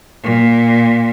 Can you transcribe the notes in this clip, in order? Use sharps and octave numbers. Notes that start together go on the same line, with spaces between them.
A#2